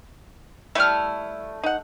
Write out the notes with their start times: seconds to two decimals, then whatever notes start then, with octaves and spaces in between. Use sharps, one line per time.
0.75 G3 A3 E4 F6
1.64 D#4 F#5